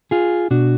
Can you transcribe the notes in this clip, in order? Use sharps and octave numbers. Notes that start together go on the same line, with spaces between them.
F4 G#4
B2 D4 F#4